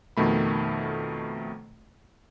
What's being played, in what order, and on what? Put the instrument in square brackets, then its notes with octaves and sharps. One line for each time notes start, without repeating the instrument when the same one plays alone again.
[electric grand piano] F2 B2 D#3 A3 B5